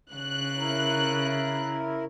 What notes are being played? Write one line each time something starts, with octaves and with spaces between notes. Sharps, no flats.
C#3 F#6
E4 A#4